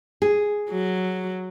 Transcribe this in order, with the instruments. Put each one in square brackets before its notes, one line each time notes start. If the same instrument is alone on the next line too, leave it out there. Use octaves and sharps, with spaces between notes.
[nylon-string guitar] G#4
[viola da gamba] F#3